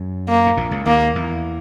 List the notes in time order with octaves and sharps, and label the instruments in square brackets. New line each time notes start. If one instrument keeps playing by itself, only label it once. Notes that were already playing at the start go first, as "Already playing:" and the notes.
Already playing: [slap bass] F#2
[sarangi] A#3
[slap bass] G#2
A#1 A#2
C#2 C#3
[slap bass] D#2 D#3 [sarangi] A#3
[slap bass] E2 E3